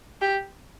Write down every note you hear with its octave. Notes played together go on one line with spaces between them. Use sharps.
G4